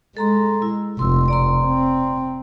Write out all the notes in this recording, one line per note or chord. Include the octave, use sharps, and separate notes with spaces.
G#3 A4 A#5 C6
E4
F1 C6 E6
D5 A#5 C6
C4